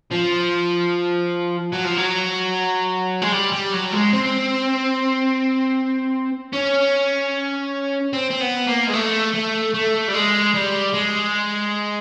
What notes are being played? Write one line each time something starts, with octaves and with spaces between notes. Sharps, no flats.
F3
F#3
F3
F#3
G#3
G3
G3
F#3
G#3
C4
C#4
C4
C4
B3
A#3
G#3
A3
A3
A3
G3
G#3
G3
G#3